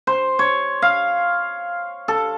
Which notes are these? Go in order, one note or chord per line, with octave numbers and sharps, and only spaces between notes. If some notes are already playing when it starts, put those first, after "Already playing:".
C5
C#5
F5
A4